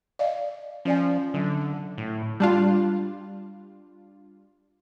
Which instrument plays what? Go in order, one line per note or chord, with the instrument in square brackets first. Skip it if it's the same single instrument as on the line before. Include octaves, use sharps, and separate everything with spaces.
[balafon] D5 D#5 F5
[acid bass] F3 [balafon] C#4 D5 G#5
[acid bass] D3 [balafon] F#3
[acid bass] A2
[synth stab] G3 D4 F4